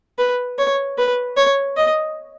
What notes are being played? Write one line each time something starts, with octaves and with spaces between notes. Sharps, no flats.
B4
C#5
B4
C#5
D#5